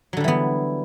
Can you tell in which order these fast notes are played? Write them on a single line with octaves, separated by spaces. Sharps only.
F#3 D3 G3 E3 B3